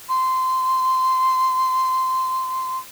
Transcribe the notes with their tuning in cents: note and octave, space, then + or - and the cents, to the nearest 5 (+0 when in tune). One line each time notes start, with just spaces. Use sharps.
C6 -15